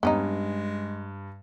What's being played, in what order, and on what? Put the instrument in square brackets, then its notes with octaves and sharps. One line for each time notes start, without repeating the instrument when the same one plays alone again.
[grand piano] G2 [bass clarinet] G#3 [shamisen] B3 C#4 D#4